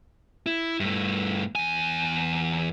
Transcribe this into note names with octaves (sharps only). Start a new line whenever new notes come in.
E4
G2 A3
E2 G#5